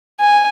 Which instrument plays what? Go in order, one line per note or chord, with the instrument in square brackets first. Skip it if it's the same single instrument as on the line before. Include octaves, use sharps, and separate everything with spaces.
[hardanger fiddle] G#5